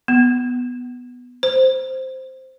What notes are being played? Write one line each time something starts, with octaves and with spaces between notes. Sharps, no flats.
B3
C5